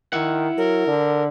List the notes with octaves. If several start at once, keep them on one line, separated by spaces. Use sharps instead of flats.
D#3 E4 F#5
F#3 A#4
D3